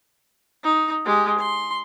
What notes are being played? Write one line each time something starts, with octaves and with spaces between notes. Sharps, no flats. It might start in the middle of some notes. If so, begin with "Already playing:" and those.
D#4
G#3 G4
C6